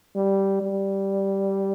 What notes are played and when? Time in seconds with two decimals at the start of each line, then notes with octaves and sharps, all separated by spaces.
0.16 G3
0.62 G3